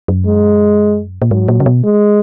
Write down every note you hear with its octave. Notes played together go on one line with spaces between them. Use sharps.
F#2
G#3
A#2
G#2 F#3
A#2
C#3
B2
G#3